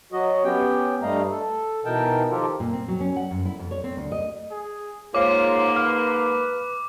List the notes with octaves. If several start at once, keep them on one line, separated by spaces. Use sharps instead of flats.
F#3 F#4 D#5
B3 C#4 G4 G5
G2 G3 A3 D#5 F5 A#5
A4
B2 E3 D#4 A#4 G5 A5
D#3 F3 F4 G4 A4 A#4
A#2
C4
F#3
C#4
F#5
F#2
E4
F2
C#5
C4
D2
D#5
G#4
G#2 A#3 F4 C5 C#5 D6
B4 F6